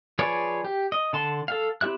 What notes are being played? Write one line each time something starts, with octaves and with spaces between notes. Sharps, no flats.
F3 G#4 B4 C#5 D5
G4
D#5
D3 A5 C6
A4 F5
C4 E4 G4 E5 F#6